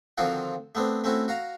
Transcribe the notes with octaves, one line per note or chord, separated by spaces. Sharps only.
D3 D#3 F3 C4 F4 F#4
A3 B3 C4 D4
A3 C4 C#4 E4 F#4
F#4 F5 A#5